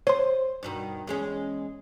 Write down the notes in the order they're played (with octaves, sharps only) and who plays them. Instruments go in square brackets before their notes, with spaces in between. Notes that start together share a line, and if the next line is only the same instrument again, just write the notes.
[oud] C5 [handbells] C#5 C6
[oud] G2 B2 D#3
E2 G#3 C#4